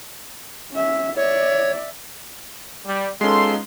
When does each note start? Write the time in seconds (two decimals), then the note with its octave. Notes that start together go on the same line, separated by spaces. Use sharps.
0.71 C#4 E5
1.16 C#5 D5 E5
2.86 G3
3.21 G#3 B3 C#4 D#4 F4 A4 C6